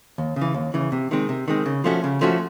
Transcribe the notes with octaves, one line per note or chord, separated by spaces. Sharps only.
D#2
C#3
E3
D#2
C#3 E3
C3
D#3 G#3 C4
C3
D#3 G#3 C4
C#3
F3 A3 C#4 F#4
C#3
F3 A3 C#4 F#4